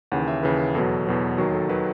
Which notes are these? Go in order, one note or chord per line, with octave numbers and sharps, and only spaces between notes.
D#2 C#3 E3 F#5
E5
D#2 C#3 E3 B4
E2 B2 F#3 A4
E2 B2 F#3
D#2 D#3 F#3 F#4
A4
D#3 F#3 B4